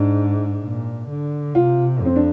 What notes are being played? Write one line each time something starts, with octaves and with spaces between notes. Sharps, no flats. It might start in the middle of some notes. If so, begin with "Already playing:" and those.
Already playing: G#2 D4
A#2
D3
C3 F4
F2 C4
D4